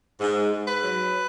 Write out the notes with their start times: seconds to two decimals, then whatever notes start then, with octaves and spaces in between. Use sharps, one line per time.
0.20 G#2
0.52 G#2
0.68 B4
0.84 F#3